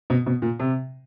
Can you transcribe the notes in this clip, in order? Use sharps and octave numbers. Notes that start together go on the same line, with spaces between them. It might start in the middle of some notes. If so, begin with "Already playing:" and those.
B2
B2
A#2
C3